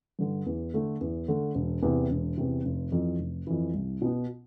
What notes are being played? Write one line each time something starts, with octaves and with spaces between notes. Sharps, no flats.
G2 D3
E2
D3 A3
E2
D3 A3
E1
E2 C3
E1
E2 C3
F1
F2 E3
F1
F2 E3
C2
B2 B3